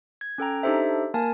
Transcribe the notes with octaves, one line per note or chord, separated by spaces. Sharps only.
G#6
C#4 A4 G5 A#5
D4 D#4 G4 A4 C5 E5
A#3 A#4 G#5 A5